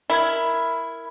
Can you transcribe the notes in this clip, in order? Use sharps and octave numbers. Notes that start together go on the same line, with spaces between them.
E4 A#4 G#6